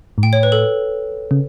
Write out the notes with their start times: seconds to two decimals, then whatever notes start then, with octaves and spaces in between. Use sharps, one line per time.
0.18 G#2
0.23 A2 G5
0.33 C#5
0.43 B4
0.52 A4
1.31 C#3